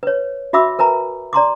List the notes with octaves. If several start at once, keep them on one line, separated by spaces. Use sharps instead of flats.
B4 C#5
F#4 E5 B5 D6 E6
A#4 B4 G#5 A#5
D5 A#5 C6 D6